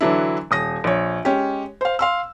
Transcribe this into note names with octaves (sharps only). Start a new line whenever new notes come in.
D3 E3 F#3 D4 E4
D#1 D#6 A#6
A#1 C#5
G#3 C#4 G4
C5 F5
F5 C6 E6